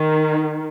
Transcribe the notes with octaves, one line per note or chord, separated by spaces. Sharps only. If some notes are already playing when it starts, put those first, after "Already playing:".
Already playing: D#3